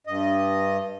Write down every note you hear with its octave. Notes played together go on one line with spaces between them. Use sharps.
G2 D#5